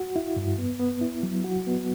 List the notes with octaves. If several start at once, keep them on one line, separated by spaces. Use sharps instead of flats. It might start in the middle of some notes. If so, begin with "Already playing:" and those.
Already playing: F#4
E4
G2
B3
B3
E4
F#3
F#4
B3